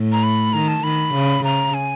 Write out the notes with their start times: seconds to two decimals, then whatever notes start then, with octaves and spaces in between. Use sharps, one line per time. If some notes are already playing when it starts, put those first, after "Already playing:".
Already playing: A2
0.12 A#5
0.23 B5
0.53 D#3 A#5
0.68 A5
0.83 D#3 B5
1.14 C#3
1.44 C#3 A#5
1.74 G#5